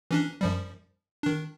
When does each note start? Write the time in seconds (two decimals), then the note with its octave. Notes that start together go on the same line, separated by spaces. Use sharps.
0.11 E3 C#4 D4
0.41 F#2 F3 G3
1.23 D#3 D4